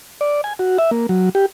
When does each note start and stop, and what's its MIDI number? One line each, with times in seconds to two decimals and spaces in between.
0.21 0.41 74
0.44 0.53 80
0.59 0.78 66
0.78 0.91 76
0.91 1.07 58
1.09 1.29 54
1.35 1.46 67